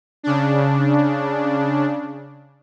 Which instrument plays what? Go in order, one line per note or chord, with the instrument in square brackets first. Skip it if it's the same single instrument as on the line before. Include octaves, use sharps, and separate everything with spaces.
[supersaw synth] C#3 D4